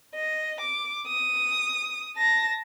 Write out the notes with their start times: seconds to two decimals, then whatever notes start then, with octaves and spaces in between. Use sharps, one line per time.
0.14 D#5
0.60 D6
1.07 D#6
2.17 A5 A#6